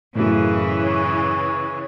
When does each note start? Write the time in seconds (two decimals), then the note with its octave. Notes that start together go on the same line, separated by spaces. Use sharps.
0.15 F#2 A2 C#3 E3
0.83 C#5